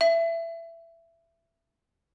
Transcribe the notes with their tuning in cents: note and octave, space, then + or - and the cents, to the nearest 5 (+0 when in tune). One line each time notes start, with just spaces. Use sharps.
E5 +15